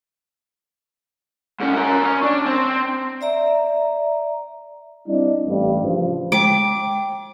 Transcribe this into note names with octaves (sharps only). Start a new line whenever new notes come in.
G#2 C#4
F#4 A#4
C#4
D4
C4
D5 E5 A#5
G3 C4 D4 E4 D#5
A1 G2
C#3 F3
G#3 G5 D6